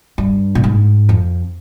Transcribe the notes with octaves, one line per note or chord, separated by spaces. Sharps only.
G2
A#2
G#2
F2